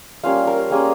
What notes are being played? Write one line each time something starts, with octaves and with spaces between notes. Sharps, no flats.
G3 A#3 C#4 F4 F5
A#4
G3 A#3 C#4 F4 G#4